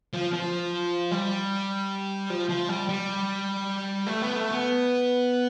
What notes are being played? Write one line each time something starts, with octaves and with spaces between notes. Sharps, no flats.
F3
F3
G3
F3
F3
G3
G3
A3
B3
A3
B3